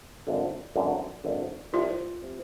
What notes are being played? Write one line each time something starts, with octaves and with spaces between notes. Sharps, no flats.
G#1 F#2 D3
G#1 F#2 D3
G#1 F#2 D3
C2 C3 F3 F4
C3 F3